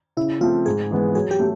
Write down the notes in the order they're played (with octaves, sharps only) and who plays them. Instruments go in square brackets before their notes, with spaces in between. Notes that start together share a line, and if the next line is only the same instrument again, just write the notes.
[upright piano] C#3 [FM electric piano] E4
[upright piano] F3 A3 C4 [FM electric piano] F4
[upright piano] G#2 [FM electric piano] G#4
[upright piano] E3 G#3 B3
[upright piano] F#3 [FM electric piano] G#4
[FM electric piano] G4
[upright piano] A3